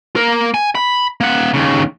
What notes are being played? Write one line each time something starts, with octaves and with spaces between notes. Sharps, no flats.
A#3 A#4
G#5
B5
A#3 F#5
D#2 C#3